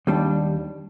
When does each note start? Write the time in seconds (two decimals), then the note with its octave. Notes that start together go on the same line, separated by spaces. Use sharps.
0.07 D#2 G3 D4